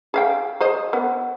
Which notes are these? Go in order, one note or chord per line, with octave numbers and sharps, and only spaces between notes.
G#4 F5 G5
G#4 C5 D#5
B3